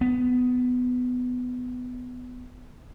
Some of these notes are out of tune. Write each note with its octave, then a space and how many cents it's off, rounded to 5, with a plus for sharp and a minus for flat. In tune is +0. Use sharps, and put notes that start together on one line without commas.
B3 +15